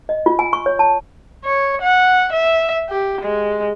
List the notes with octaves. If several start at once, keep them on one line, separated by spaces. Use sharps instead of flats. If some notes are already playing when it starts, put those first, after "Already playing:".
D#5
F4
G#5
C#6
C#5
A5
C#5
F#5
E5
G4
G#3